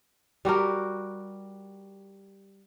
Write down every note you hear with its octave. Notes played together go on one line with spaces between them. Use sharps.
G3 F#4 G4 A#4